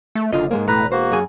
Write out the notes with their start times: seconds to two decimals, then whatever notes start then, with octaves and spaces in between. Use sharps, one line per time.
0.15 A3
0.33 F#1 D3 F4 D#5
0.51 G#2 G#3 A#3
0.68 E1 A2 A3 B4 A#5
0.92 A#3 F#4 C5
1.12 F#2 G#4 G#5